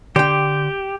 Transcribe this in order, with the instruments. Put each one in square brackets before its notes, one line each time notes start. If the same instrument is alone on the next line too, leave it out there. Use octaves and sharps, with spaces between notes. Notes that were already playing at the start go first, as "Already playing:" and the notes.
[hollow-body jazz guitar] D3 G5 [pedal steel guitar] G4